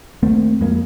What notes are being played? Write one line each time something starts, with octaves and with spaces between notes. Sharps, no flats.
D#2 A3 A#3 C4
F2 G#3 A#3